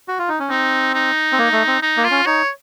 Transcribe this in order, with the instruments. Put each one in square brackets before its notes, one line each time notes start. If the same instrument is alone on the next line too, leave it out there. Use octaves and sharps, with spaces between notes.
[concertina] F#4
F4
D#4
C#4
[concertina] C4 [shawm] D#4
[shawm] D#4
[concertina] C4
A#3
A3
C4
[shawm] D#4
[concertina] A#3
[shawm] F4
[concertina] C#4
[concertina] D#4 [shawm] C#5